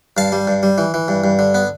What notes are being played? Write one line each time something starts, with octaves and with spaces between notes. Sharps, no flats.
G2 F5 A5
G3
G2
G3
E3
E3
G2
G2
D3
B3